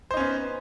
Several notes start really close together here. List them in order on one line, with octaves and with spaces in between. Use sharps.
C5 D#4 C#4 B3